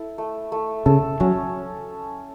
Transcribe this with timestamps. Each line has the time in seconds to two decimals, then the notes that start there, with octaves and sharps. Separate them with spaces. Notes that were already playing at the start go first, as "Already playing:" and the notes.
Already playing: E4 A4
0.18 A3
0.52 A3
0.86 C#3 A4
1.20 F#3 C#4